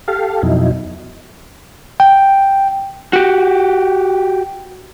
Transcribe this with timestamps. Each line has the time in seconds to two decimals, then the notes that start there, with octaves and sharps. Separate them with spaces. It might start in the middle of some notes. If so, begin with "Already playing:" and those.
0.08 G4 A4 F5
0.43 F2 B2 F#3 D#4 E4
2.00 G5
3.13 F#4 G4